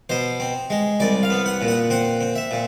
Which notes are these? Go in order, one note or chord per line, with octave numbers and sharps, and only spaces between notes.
B2 C5
C4
G#3
C2 D5
F5
B3
F#5
A#2
F#5
C4 F#5
C4
E5
A#2